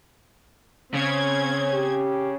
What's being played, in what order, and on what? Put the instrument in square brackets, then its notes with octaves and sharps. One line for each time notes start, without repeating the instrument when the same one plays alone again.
[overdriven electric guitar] C#3 [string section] C4 C#4 G#6
[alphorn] G4